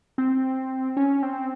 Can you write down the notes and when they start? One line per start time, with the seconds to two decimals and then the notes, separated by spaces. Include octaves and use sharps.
0.18 C4
0.97 C#4
1.23 C4